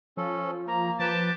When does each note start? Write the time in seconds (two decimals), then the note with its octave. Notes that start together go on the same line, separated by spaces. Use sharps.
0.17 F3 C#4 A4
0.67 A#3 A#5
0.99 F3 G4 B4 A5